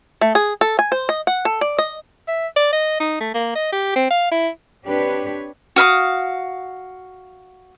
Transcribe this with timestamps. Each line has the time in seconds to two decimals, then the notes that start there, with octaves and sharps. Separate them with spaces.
0.21 A3
0.35 G#4
0.61 A4
0.79 G#5
0.92 C5
1.09 D#5
1.27 F#5
1.45 A4
1.61 D5
1.78 D#5
2.28 E5
2.56 D5
2.73 D#5
3.00 D#4
3.21 A3
3.34 A#3
3.55 D#5
3.73 G4
3.96 C4
4.11 F5
4.32 E4
4.85 C4 D4 G4 B4 C#5
5.76 F#4 F5 B5 D#6